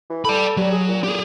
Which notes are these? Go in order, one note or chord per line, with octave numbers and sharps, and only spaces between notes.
E3
A4 D5 B5
F#3 G3
G#4
A#2
G4 G#4